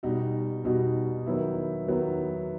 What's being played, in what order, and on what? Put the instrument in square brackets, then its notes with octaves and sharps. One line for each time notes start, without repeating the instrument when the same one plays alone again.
[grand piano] B2 G3 D#4 F#4
B2 G3 D#4 F#4
D#3 F#3 B3 E4
D#3 F#3 B3 E4